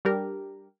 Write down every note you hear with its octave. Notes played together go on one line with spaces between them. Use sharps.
G3 D4 G4 A#4